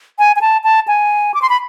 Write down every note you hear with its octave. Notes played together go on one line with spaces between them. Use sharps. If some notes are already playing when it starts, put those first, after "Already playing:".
G#5
G#5
A5
A5
G#5
D6
C6
B5